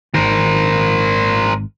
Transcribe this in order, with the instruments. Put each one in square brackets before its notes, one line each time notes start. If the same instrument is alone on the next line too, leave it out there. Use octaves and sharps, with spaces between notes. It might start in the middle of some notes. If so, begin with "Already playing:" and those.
[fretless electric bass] G#1 D#3 [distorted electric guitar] A#4 C5